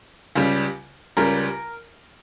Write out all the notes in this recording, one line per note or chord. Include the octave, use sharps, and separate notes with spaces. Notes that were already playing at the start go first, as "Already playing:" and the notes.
C#2 C#3 G3
C#2 C#3 G3 A#4